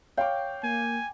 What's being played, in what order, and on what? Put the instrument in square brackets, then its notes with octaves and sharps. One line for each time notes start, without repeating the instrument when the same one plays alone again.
[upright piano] C#5 F5 [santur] G5 D6
[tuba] A#3 [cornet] G#5